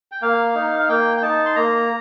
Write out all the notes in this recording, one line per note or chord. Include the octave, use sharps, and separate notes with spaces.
G5
A#3 F5
D#4
F5
A#3 G5
G5
D#4 A5
C6
A#3 A#5